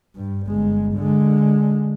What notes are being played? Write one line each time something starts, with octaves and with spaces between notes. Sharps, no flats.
G2
G1 G#3
D3 G#3